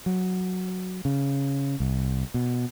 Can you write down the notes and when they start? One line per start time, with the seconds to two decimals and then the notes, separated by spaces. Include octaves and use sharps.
0.06 F#3
1.05 C#3
1.80 C2
2.34 B2